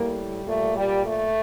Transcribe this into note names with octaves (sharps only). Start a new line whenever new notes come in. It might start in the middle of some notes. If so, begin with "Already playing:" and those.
Already playing: A2 G3 A#3
A#2 G3 A3
G3
A3